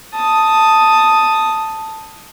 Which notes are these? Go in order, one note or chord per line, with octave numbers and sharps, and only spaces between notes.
A5 D#6